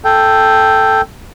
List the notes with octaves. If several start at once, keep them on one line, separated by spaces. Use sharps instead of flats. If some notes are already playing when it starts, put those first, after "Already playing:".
A4 G5